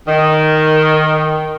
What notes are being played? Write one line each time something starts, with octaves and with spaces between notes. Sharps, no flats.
D#3